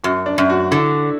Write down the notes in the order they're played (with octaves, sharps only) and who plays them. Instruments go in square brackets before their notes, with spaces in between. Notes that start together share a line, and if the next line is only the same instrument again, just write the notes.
[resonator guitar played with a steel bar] F#2 [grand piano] F#4
[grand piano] D4
[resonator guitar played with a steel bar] F#2
[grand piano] F#4
[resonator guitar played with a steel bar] D3 [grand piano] E4